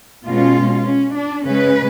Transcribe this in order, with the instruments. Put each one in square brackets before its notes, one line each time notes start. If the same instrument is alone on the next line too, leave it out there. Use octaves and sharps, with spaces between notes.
[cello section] B2 G#3 C#4 F4
C#4
D4
C#3 G#3 C#4 B4